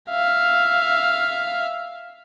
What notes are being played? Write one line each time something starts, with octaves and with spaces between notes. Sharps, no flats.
E5 F5